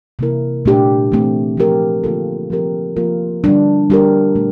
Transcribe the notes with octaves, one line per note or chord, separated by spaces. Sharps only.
C3 E3 A#3 E4 A#4
A#2 A3 D4 G4
E3 A3 C4
F3 C4 G4 A#4
D3 F3 A#3 F4 A4
F3 C4 G4 A#4
F3 A#3 F4 A#4
D3 G3 D4
G3 D4 G4 A#4
A#2 A3